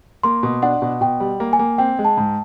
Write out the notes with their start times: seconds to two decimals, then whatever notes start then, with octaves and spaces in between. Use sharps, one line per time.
0.23 A#3 C6
0.43 B2
0.62 D4 F#5
0.82 B2
1.01 B2 G5
1.20 G3
1.40 A#3
1.53 G#5
1.59 A#3
1.78 C4 G5
1.99 G#3
2.05 A5
2.17 G#2